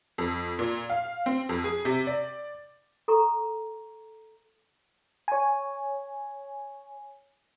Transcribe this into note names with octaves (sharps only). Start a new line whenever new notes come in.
F2
A#2
F5
C4
F2
G#4
C3
D5
A4 A#5 C#6
C#5 G#5